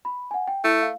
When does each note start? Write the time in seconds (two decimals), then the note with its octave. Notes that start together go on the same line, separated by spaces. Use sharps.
0.05 B5
0.31 F#5 G#5
0.48 G5
0.64 A3 E4
0.82 F5